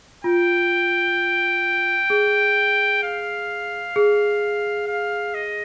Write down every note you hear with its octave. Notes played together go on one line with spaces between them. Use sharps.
F4 G5
G#4
F5
G#4
F5
D#5